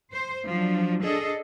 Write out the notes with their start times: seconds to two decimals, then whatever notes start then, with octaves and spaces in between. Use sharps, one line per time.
0.13 C5
0.46 F3 F#3 D4
1.01 D4 G#4 A4 D#5